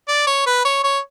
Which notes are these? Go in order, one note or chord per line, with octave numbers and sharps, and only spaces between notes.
D5
C#5
B4
C#5
C#5